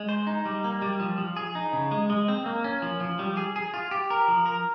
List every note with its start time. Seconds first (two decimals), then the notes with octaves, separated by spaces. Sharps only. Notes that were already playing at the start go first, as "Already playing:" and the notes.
Already playing: G#3
0.09 C5
0.27 D#4
0.45 G3
0.64 A#3
0.82 G3
1.00 F3
1.18 F3
1.36 G#4
1.55 D#4
1.73 C#3
1.91 G#3
2.10 G#3
2.28 C4
2.46 A#3
2.64 C#4
2.82 F3
3.00 F3
3.19 G3
3.37 G#4
3.56 G#4
3.74 F4
3.91 G4
4.10 A#4
4.28 F3
4.46 A#4